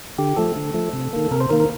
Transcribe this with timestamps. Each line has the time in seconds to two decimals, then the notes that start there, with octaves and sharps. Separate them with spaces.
0.18 D3 G4
0.37 F3 A3 A4
0.56 D3
0.74 F3 A3
0.93 C3
1.13 D#3 A#3
1.31 C3 A#4
1.40 C5
1.49 D#3 A#3 A#4
1.60 A#4